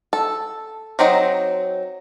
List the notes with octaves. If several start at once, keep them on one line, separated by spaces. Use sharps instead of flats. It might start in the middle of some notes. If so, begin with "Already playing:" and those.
A4
F#3 C4 D#4 D#5